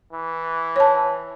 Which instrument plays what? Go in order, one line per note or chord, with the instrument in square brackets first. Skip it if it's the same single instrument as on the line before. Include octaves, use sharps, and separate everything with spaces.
[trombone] E3
[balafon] C#5 A5